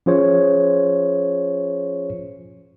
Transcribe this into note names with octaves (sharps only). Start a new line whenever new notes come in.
F3 C#4 F4 G#4 C5 C#5